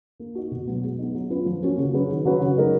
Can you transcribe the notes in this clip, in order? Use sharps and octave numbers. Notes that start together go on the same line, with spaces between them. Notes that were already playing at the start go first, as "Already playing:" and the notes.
A#3
D#4 F#4
B2
F#3 B3
G#3
B3 D#4
F#3
C#4 F4 B4
F3
A#3 C#4 F#4
C#3
F#3 C#4 G#4 B4
D#3
F#3 C#4 F#4 B4
C#3
G#3 D#4 A#4